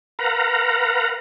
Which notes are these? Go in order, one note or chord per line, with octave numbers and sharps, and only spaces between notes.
A#4 B4 F5 F#5 A#5